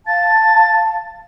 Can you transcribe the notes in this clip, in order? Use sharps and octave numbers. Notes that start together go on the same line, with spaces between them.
F5 A5 A6